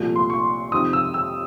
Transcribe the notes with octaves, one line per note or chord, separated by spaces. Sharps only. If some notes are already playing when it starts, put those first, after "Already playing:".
Already playing: C2 A#2 F3 A3
C6
C#6
F2 C3 D#3 D#6
E6
E6